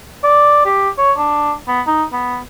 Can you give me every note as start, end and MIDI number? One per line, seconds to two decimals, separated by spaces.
0.23 0.61 74
0.65 0.90 67
0.98 1.12 73
1.17 1.53 62
1.68 1.82 59
1.87 2.04 63
2.13 2.39 59